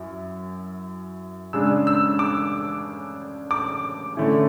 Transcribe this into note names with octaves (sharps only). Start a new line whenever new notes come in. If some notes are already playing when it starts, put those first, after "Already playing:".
Already playing: F#2 E4
C#3 G#3 D4 E6
E6
D6
D6
D3 A3 C#4 E4